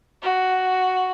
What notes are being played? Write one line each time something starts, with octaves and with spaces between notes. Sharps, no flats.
F#4